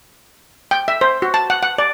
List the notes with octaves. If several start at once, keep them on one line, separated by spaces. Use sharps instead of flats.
G5
E5
C5
F#4
A5
F#5
F#5
D5